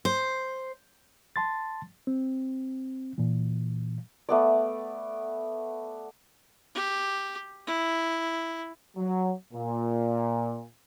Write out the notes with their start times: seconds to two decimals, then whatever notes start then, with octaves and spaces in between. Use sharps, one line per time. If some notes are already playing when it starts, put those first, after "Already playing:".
0.05 C5
1.36 A5 C6 A6
2.07 C4
3.18 A#2 E3
4.29 A3 B3 D5
6.75 G4
7.67 E4
8.97 F#3
9.53 A#2